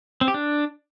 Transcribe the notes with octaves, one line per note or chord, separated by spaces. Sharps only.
C4
G4
D4